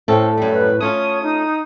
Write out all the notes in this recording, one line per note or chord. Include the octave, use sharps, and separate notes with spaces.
A2 C4 C#4 A4
F#2 G3
B4
A3 C#4 F4 C#5 D#6
D#4